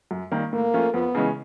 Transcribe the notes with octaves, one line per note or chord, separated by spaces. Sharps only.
F#2
D#3 G3 A#3
A2 A#3
F3 A3 C#4 F4
F2 B3
C#3 E3 G#3 C#4